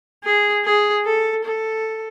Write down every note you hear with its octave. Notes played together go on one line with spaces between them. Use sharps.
G#4
G#4
A4
A4